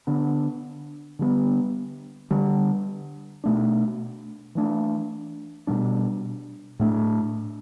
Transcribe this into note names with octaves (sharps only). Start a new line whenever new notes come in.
D3 B3 D4
D3 G3 B3
D3 G3 D4
B2 A3 D4
E3 A3 D4
B2 G3 D4
A2 A3 D4